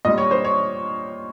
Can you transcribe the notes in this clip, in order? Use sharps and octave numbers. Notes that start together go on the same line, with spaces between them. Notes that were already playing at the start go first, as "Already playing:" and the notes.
A#2 G3 D#5
C#5
C5
C#5